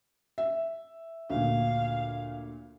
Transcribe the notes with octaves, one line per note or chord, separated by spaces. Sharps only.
E5
D2 A#2 F5